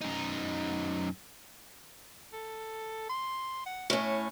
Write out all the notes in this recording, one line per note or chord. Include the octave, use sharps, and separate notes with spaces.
F#2 D#4
A4
C6
F#5
A2 C#4 E4